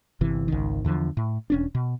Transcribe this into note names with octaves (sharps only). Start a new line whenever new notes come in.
G1 C3 E3
G#1 C#2 D#3
E2 D3 E3 F3
A2
E1 C#4 D4
B2